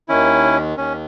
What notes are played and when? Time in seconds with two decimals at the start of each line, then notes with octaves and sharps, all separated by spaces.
0.08 D#2 D#3 C#4 E4
0.77 D#2 D#3 C#4